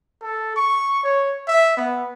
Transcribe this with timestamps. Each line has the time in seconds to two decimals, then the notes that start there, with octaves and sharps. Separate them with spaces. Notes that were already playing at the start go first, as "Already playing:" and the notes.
0.21 A4
0.56 C#6
1.03 C#5
1.47 E5
1.77 B3